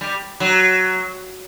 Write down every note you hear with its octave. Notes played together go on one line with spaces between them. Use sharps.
G3
F#3